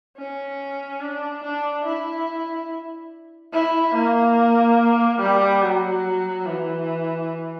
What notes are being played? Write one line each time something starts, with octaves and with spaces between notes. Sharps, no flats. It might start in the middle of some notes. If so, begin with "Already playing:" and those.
C#4
D4
D4
E4
E4
A#3
G3
F#3
E3